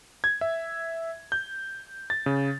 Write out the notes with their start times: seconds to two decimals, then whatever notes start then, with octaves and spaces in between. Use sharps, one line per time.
0.24 G#6
0.41 E5
1.32 G6
2.10 A6
2.26 C#3